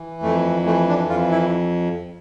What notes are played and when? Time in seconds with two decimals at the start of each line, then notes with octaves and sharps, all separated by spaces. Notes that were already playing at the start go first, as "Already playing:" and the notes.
Already playing: E3
0.22 F2 A3
0.66 E3 A3
0.88 D4
1.09 F2 F4
1.31 E4